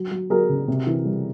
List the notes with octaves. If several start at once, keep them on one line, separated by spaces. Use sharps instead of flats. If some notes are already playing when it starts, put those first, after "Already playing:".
Already playing: F#3
F#3
F#3 G#4 A#4
C#3
C3
E3
G3